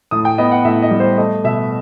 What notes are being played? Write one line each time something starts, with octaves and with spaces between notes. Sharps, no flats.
A2 D#6
G5
B3 D#5
F#5
A2 E5
D#5
G3
C5
A3 D#5
B2 E5